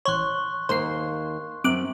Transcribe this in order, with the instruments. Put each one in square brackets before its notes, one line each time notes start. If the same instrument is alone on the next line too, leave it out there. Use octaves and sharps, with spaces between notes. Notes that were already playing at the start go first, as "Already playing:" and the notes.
[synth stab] A1 C#5 [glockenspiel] C6 C#6 F#6
[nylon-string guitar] D#2 A#3 [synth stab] C5 C7
[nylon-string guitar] F#2 [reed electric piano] C4 [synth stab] D6 F#6